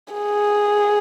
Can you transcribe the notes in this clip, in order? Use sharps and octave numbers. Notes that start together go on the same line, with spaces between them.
G#4